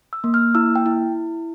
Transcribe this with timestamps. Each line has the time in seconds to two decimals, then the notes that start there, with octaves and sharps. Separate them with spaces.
0.13 E6
0.24 A#3
0.34 F6
0.55 E4 E6
0.75 G5
0.86 E4